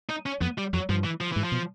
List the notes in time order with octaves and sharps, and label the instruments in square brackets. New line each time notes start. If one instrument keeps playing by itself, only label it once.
[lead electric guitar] D#4
C#4
[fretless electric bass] F2 [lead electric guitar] B3
[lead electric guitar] G3
[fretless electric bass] F2 [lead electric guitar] F#3
[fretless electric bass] G2 [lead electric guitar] F3
[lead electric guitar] E3
F3
[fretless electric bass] G#2 [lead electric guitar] E3
[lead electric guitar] F3
[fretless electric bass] B2